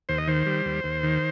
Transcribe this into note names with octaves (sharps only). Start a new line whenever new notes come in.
D#2 C5
D#5
D#3 C5
G3
D#2
D#2
D#3